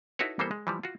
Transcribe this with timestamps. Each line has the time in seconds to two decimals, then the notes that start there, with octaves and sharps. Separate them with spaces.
0.19 D#4 E4 F#4 A4 B4 C#5
0.39 E3 G3 A#3 B3 A4 C5
0.51 G#3
0.67 E3 F3 G3
0.83 F4 F#4